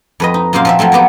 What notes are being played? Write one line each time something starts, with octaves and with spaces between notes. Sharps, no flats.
F2 B4 D#5
D#4
F#2 A#2 A#3 C5 F5
F3 C4 E5
F3 F#3 A3 C4
F#3 A#3 B3 G4